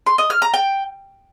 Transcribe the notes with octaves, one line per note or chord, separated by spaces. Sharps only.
C6
D#5
F6
A#5
G5